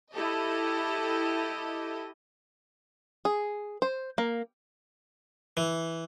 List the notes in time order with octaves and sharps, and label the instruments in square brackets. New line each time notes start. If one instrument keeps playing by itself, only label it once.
[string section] E4 G4 A4 D#5
[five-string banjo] G#4
C5
A#3
[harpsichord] E3